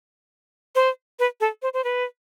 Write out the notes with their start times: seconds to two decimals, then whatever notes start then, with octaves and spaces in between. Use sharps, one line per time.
0.75 C5
1.19 B4
1.41 A4
1.62 C5
1.74 C5
1.84 B4